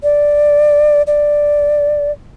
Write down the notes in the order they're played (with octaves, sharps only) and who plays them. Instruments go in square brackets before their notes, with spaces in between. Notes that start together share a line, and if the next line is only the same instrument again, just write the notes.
[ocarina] D5
D5